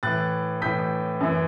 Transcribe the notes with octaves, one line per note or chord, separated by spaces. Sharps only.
A2 E3 F#6 A6
A2 E3 G6 B6
F#2 E3